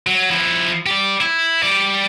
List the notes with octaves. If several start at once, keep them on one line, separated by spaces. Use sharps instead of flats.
F#3
F3 E4
G4 D5
E4
G3 D5